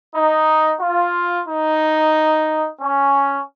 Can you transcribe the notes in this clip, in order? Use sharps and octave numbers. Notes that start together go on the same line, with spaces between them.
D#4
F4
D#4
C#4